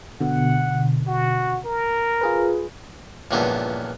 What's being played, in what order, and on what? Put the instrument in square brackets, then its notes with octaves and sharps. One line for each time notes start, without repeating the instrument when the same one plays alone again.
[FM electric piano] B2 D3 [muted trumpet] F#5
[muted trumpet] F#4
A#4
[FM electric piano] F4 G#4 B4
[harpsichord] C#2 G2 A#2 E3 F3 B3